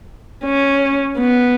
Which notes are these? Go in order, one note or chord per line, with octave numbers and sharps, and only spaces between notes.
C#4
B3